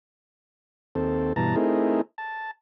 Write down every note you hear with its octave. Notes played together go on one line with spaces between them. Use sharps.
D#2 C4 A4
G2 B2 E3 A5 A#5
A3 C4 D#4 E4 G#4 A#4
A5